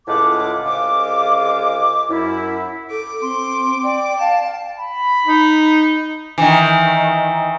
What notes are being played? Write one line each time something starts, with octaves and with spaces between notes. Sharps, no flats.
C#2 A2 G#3 F4 F#5 D6
C2 C#3 G#3 F4 D6
F#2 E4
A4 D6
C4 C6
D5 G5
F5 A5
B5
D#4
D#3 E3